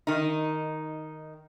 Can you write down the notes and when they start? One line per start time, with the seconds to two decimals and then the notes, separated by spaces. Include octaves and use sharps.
0.07 D#3 D#4